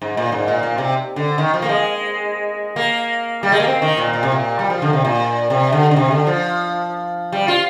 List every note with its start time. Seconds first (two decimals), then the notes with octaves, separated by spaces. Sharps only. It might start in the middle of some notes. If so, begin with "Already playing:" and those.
0.02 G#2
0.17 A#2
0.32 G#2
0.48 A#2
0.63 A#2
0.78 C3
1.16 D3
1.38 D#3
1.54 F3
1.62 A#3
1.69 G#3
2.76 A#3
3.43 G3
3.52 G#3
3.60 A#3
3.67 C4
3.82 D#3
3.97 A#2
4.13 A#2
4.23 C3
4.32 A#2
4.59 G3
4.70 F3
4.82 D3
4.93 C3
5.05 A#2
5.50 C3
5.72 D3
5.91 D3
5.96 C3
6.11 D3
6.27 F3
7.32 G3
7.48 F4